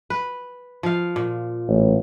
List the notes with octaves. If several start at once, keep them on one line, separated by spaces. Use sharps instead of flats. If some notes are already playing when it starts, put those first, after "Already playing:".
B4
F3 F5
A#2
A1